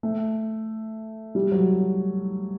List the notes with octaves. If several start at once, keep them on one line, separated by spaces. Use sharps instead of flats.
A3
G3
F#3